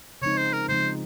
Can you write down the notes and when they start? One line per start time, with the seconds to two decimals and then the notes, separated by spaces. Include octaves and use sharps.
0.22 C#3 F3 G#3 C4 D#4 C#5
0.38 C5
0.53 A#4
0.69 C#3 F3 G#3 C4 D#4 C5